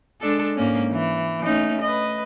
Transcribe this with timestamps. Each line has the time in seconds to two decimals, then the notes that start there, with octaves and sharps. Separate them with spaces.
0.21 G#3 D4 A4
0.56 G#2 A#3 C#4
0.91 E3
1.44 A3 C#4 D#4
1.82 B4 D#5